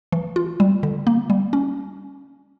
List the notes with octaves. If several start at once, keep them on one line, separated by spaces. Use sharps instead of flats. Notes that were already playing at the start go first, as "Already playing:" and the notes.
E3
F4
G3
D3
A#3
G3
C#4